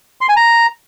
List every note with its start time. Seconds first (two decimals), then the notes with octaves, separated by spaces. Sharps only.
0.21 C6
0.29 G#5
0.37 A#5